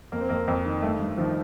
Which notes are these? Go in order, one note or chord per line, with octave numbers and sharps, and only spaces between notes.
F2 A#3
C4
F2 A#3
F2
D#3
G2 A3
G2
D#3 F3